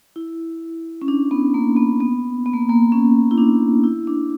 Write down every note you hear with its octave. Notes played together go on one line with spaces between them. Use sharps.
E4
C#4
D4
B3
A#3
B3
B3
B3
A#3
A#3
C#4
E4
D4
E4
D4